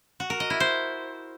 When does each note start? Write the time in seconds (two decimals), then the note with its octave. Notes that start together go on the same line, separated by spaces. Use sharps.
0.20 F#4
0.30 A#4
0.40 D#5
0.50 E4
0.60 C5